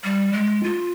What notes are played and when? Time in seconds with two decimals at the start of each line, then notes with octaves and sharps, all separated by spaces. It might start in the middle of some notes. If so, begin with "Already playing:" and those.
0.04 G3
0.33 G#3
0.63 F4